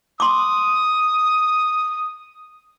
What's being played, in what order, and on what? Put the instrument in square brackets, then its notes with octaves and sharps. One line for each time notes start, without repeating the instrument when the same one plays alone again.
[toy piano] C6 D6 [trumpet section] D#6